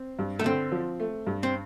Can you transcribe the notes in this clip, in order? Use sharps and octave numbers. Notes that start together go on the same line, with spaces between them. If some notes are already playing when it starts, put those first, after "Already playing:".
Already playing: C4
G2
A3
D3 C4
F3
A3
G2
C4